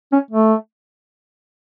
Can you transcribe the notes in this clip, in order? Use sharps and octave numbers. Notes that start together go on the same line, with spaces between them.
C#4
A3